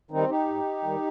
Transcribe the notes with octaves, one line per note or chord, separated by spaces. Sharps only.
D#3 G3 C4 D#4
D#4 G4
G#2
D#3 G3